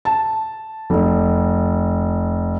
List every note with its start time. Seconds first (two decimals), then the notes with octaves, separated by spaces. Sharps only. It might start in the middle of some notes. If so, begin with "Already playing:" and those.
0.05 A5
0.90 F1